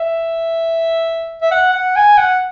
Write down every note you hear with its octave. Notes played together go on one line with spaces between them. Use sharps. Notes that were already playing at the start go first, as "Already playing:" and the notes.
Already playing: E5
E5
F#5
F#5
G#5
F#5